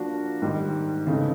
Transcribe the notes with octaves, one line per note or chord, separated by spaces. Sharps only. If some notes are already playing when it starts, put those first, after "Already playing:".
Already playing: F3 A#3 D4 F#4 A#4
G#2 D#3 G3
C#3 E3 A3 C4 D#4